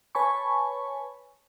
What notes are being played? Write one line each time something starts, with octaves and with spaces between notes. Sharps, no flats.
B4 C#5 G#5 A5 B5 C#6